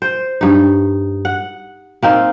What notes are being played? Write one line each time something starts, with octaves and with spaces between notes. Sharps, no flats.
C5
G2 D#4
F#5
A#3 C4 D#4